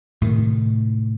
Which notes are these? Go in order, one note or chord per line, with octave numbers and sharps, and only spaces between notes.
A2 C3 D#3